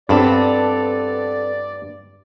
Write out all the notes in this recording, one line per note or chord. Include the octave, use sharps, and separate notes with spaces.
G2 B3 C4 A4 D5